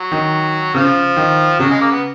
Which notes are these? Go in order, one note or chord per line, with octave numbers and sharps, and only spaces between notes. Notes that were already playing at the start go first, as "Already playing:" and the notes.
Already playing: F#3
D#3
C#3 F3
D#3
C#3 F#3
G#3
A#3
B3